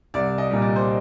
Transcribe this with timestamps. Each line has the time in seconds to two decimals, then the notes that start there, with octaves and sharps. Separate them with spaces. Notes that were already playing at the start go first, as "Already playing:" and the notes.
0.14 C2 D5
0.38 D#5
0.50 A#2 G3
0.62 D5
0.76 C5